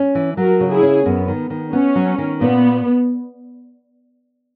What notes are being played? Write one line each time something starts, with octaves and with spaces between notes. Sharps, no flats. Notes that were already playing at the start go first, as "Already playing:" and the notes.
Already playing: C#4
E3
F#3 F#4 A#4
C#3
E4 G#4
C#4
F#2 B3
D#3
D#3
B3 C#4
F#3
D#3
A#2 B3